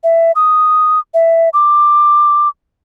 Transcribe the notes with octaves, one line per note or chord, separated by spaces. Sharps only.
E5
D#6
E5
D6